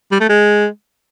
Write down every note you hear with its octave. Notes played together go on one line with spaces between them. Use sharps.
G3
A3
G#3